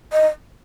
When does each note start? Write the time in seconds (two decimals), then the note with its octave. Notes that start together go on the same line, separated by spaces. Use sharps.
0.12 D#5